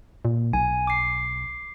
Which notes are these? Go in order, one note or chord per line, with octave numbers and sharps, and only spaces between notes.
A#2
B1 G#5
D6 C7